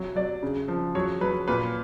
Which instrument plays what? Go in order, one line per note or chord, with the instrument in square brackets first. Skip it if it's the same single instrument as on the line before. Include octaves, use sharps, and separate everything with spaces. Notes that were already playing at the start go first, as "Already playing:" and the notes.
Already playing: [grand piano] C3 F#3
F#3 D5
C#3
F3
F#3 C#5
F#3 B4
A#2 B4